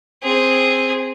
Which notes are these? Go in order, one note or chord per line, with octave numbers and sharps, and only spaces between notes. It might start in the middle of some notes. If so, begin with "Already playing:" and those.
C4 G#4